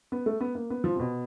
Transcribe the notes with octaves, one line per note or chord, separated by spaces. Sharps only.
B3
A3
B3
A#3
B3
F3
C3
B2